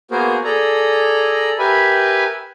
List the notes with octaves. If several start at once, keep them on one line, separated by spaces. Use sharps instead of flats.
A#3 B3 F#4 G#4 A#4 C5
G#4 A4 D5 A#5
G4 A#4 B4 E5 G#5 B5